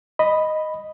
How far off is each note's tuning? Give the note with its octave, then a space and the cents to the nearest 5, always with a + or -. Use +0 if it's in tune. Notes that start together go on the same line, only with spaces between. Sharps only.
D#5 +0 B5 +0